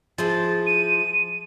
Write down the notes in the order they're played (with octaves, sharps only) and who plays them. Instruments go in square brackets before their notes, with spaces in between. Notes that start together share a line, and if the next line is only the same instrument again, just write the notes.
[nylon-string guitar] F3 [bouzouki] E4 G#4 C5 [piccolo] A6
[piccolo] D#7